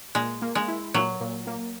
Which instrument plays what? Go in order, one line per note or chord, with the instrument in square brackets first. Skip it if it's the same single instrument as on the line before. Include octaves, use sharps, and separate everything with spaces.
[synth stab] A#2 [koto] G#3
[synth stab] A#3
[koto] G#3
[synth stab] E4
[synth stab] A#2 [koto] F#3
[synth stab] A#2
A#3